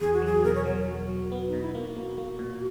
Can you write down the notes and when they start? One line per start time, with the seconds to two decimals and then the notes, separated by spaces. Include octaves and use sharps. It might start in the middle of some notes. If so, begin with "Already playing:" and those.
0.01 E2 G#4
0.13 F#4
0.22 F#3 G#4
0.44 B2 A#4
0.55 C#5
0.65 F#3 A#4
0.77 A#4
0.87 F#3 F#4
1.09 F#3
1.32 B3
1.48 D#4
1.53 B2
1.61 E4
1.75 A#3 F#4
1.97 A#3
2.18 A#3
2.39 A#2